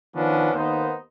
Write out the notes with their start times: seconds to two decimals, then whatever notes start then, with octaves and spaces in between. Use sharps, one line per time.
0.15 D#3 F3 B3 C#4 D4
0.53 D#2 A#3 B3 D#4 C5